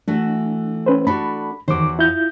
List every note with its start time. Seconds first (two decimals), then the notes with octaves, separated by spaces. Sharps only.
0.08 E3 A3 D4 F#4
0.86 C#4 B4 C5
1.07 D4 F#4 A4 B5
1.68 E2 D#3 F#4 C5 D6
1.99 E4 F4 G6